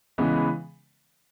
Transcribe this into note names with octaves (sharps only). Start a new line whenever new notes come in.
C#3 E3 G#3 B3